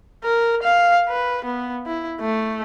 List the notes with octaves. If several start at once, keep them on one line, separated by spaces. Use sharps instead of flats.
A#4
F5
B4
B3
E4
A3